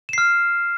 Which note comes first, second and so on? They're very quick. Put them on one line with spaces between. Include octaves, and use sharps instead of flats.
E7 C7 F6